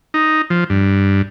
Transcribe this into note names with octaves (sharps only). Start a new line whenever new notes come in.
D#4
F3
G2